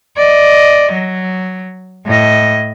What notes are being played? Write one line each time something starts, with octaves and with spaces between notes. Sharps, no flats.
D5 D#5
F#3
A2 D#5